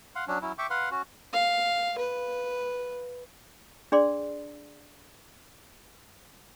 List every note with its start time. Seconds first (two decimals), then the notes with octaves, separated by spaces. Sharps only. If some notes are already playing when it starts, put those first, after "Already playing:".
0.15 F5 F#5 C6
0.28 F#3 C#4 D4
0.42 F#3 C#4 E4
0.58 E5 G5 C#6 D6
0.70 B4 F5 F#5 C6
0.91 C#4 F#4
1.33 F5
1.98 B4
3.92 D4 G#4 D5 C6